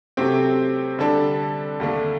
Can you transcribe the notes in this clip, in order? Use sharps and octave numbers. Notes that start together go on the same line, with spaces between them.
C3 F#3 A3 C4 G4
D3 G3 D4 A4
D#2 D3 A3 D4